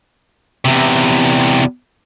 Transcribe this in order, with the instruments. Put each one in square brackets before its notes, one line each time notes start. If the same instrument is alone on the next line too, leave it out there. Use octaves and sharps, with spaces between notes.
[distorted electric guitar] E2 C3